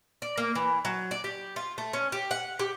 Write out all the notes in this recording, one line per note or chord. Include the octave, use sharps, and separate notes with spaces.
D5
A#3
E3
F#3
D5
G4
F4
A3
C#4
G4
F#5
G4